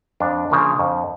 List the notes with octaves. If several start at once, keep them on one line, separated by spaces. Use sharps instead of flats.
F2 D4
C#3 F3 A#3
F2